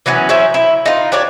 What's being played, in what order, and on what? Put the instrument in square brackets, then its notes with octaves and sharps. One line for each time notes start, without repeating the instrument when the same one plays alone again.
[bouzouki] E3 F#3 B3 C#4
F#3 C#4 E4 C5
E4
D#4 F4
D4 G4 C#5 D5